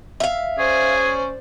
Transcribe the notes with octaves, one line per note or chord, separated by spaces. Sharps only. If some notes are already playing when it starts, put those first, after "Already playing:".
E5 F5
C#4 G#4 C5 D5